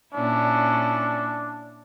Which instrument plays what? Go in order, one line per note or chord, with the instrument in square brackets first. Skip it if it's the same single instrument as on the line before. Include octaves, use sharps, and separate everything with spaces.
[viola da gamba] A#2 C#4 E4 [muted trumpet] D4